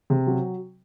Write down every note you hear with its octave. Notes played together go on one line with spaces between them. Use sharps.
C3
F#3